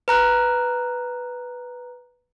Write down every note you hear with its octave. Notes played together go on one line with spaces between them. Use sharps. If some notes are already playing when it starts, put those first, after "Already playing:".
B4 A#5 F#6